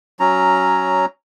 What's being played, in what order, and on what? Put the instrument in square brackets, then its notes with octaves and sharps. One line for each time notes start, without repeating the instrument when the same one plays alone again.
[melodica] F#3 C#4 A#5